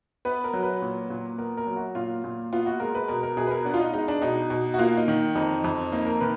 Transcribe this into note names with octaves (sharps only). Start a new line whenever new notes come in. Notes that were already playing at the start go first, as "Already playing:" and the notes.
B3 B4
A#4
F#3
B4
A#2
A#2
B3 A#4
A#4
F#3
F#4
A#2 F4
A#2
B3 F4
F#4
G#3 A#4
B4
B2 A#4
A#4
B2 G#4
B4
A#4
B3 D4
F4
D#4
G#3 D#4
D4
B2 D#4
B2
F#4
A#3 F4
D#4
D#3
F2 D#4
F2
A#3 D#4
A#4
D#3 B4